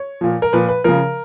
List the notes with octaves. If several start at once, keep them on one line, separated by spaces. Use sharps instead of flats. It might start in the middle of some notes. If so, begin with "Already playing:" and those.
Already playing: C#5
A#2 F3
A#4
A#2 F3 B4
B4
C#3 F3 A#4